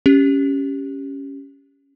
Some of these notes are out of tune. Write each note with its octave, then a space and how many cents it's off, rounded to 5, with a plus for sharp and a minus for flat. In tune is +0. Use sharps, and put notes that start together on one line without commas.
C#4 +0 G4 +0